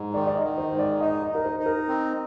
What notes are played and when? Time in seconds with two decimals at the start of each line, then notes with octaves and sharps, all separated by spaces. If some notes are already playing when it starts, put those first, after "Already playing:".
Already playing: G#2
0.14 D#3 D5
0.27 D5
0.35 D#5
0.43 D#3
0.58 C5
0.73 G#2
0.79 D5
1.00 D#4 D#5
1.22 D#5
1.30 D#4 A#4
1.45 C5
1.59 D#4
1.66 A#4
1.88 C4